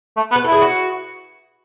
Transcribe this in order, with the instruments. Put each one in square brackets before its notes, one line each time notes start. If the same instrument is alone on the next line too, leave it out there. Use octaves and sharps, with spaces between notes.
[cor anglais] A3
B3
[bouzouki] B4
[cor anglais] E4 [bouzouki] A4
[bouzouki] G#4
F#4